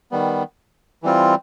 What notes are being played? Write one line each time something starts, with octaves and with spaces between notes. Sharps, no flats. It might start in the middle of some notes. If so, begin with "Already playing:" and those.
D#3 G3 B3
E3 G3 C4 F4